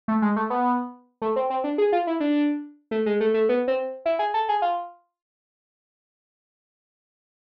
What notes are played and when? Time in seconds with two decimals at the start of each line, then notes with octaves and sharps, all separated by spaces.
0.08 A3
0.22 G#3
0.36 A3
0.50 B3
1.22 A3
1.36 C4
1.50 C4
1.64 D4
1.78 G#4
1.93 F4
2.07 E4
2.20 D4
2.91 A3
3.06 G#3
3.20 A3
3.34 A3
3.49 B3
3.68 C4
4.06 E4
4.19 G#4
4.34 A4
4.49 G#4
4.62 F4